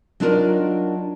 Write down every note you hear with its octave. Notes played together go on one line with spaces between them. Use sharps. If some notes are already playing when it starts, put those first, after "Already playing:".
F#3 D4 D#4 F4 A#4 D5